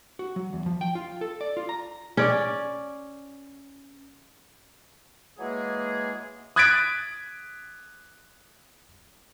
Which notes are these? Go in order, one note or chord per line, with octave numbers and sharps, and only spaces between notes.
F#4
F#3
E2
F3
G5
F4
A4
D5
F4
A#5
C#4 D5
E3 F#3 G#3 A#3 G#4
D#6 F#6 G#6 A6 B6 D7